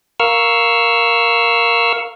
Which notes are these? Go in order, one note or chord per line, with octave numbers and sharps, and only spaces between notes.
A#4 F5 C#6 E6 F6